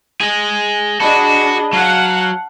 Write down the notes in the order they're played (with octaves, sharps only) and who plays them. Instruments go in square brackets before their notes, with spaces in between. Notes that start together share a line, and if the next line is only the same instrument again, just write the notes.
[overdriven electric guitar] G#4 D#5
[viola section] D4 G#4 D#5 [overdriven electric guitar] F#4 [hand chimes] A5 B5
[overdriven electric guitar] F#3 [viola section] F5 F#5 [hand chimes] A5